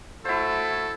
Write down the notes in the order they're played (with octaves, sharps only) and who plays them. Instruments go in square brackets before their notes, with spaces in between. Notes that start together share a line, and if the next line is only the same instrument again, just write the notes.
[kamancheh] A3 F#4 [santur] E4 C5 [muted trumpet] A4